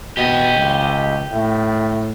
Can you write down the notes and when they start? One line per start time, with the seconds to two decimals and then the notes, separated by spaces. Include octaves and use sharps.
0.17 B2 G4 D#5
0.55 C#2
1.31 A2